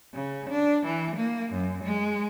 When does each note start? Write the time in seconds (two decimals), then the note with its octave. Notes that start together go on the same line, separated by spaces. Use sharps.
0.14 C#3
0.50 D4
0.86 E3
1.16 A#3
1.53 F#2
1.84 G#3